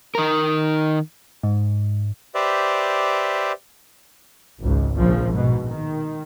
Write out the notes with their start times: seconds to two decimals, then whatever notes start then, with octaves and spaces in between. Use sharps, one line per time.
0.15 D#3 A#4
1.43 G#2
2.35 G4 B4 C5 D5 E5
4.60 G#1 C#2
4.95 A#1 C#3 F3
5.32 G#2 B2
5.66 D#3